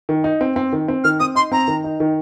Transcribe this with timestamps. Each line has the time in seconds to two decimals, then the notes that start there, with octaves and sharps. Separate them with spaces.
0.09 D#3
0.24 D#4
0.41 C4
0.56 C4
0.73 D#3
0.88 C4
1.04 D#3 F6
1.20 C4 D#6
1.35 D#4 C6
1.52 C4 A#5
1.68 D#3
1.84 D#4
2.00 D#3